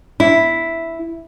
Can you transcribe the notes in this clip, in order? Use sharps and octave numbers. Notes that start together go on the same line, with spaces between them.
E4